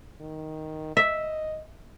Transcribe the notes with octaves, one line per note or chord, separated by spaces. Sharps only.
D#3
D#5 E5